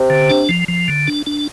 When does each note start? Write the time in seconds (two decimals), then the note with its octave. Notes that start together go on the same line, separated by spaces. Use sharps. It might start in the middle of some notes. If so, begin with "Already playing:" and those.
Already playing: C3
0.10 D3
0.30 D4
0.49 F3
0.68 F3
0.88 D3
1.08 D4
1.27 D4